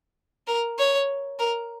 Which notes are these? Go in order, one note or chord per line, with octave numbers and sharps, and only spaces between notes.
A#4
C#5
A#4